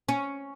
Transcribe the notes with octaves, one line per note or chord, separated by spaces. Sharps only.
C#4